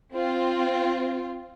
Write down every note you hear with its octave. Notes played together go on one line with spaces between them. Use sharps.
C4 F4